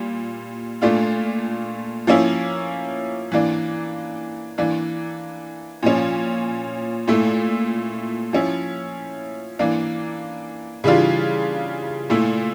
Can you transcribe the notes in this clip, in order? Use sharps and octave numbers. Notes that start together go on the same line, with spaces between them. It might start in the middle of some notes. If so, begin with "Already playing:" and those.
Already playing: A#2 G3
A#2 A3 D4 F4
F3 A#3 C#4 E4
E3 A#3 D4
E3 A#3 D4
A#2 F3 C#4
A#2 A3 E4
F3 C#4 E4
E3 A#3 D4
C#3 E3 G3 D4 F4
A#2 A3 E4